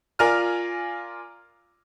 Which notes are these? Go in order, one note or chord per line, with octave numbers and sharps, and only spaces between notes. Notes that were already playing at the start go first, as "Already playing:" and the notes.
F4 A#4 D5 G#5 F6